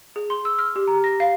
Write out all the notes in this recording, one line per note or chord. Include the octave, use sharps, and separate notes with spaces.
G#4
C6
E6
F6
G4
A#5
A#6
F5